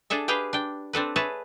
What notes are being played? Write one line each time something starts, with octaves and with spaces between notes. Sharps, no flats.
D4 G#4 A4 E5
G4 G#4 B4 F5 G5
D4 G5
C4 D4 A4 B4
G#4 B4 C#5 E5 A5